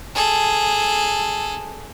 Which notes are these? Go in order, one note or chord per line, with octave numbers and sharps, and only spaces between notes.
G#4 A4